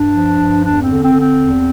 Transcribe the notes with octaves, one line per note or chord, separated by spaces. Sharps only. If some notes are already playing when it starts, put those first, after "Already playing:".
Already playing: G2 D4
F3
G2
E2 D4
C4
D3
C4
D3
C4
E2